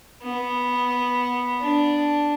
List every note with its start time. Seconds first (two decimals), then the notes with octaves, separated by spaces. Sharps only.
0.23 B3
1.60 D4